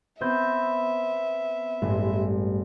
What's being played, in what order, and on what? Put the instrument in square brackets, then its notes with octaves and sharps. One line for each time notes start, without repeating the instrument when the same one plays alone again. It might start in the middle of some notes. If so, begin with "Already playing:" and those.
[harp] B3 C4 G6 [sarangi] E5
[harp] A1 G2 G#3